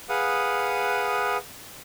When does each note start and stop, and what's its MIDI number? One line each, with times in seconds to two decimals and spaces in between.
0.09 1.37 68
0.09 1.37 71
0.09 1.37 77
0.09 1.37 78
0.09 1.37 87